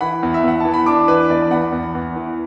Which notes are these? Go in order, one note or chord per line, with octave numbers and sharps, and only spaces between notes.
E3 F#5 B5
E2
E5
E2 F#5
E3 A5
B5
D4 A5 D6
E3 B4
E2 D5
E2 F#5 B5
E2
E2
E3